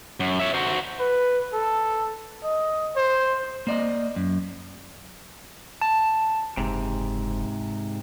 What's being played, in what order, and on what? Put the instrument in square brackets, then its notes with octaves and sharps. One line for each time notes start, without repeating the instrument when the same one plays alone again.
[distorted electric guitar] F#2
C#5 E5
F#4 C5
[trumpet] B4
A4
D#5
C5
[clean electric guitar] A#3 D5 D#5
F#2
[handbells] A5
[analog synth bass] F#1 [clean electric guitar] G#2 C3